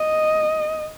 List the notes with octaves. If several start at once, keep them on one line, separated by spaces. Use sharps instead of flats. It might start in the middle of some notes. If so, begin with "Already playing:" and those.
Already playing: D#5